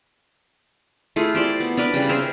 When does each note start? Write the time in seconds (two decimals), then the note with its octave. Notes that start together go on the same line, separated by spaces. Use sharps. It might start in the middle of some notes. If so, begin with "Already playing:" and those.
1.16 A3 E4 F4 G#4
1.35 G4 C5 D5
1.60 B3
1.77 D4 A#4 B4 D5
1.94 C#3 G3
2.09 G#4 A#4 C5 E5